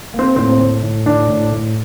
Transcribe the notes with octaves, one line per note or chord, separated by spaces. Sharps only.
A#3
C4
A2 C4
A2
A2
A2 D4
A2
A2